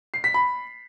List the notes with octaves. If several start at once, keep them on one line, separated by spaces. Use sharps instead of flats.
C7
B6
B5